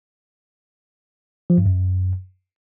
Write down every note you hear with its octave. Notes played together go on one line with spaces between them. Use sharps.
F3
G2
F#2